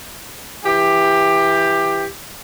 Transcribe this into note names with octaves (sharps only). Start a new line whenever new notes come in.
E3 G4